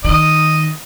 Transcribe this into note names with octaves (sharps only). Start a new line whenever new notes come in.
D#3 D#5